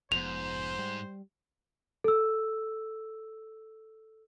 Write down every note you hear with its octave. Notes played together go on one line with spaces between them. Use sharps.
F1 G#2 F3 B3 C5 F7
G3
A4 E6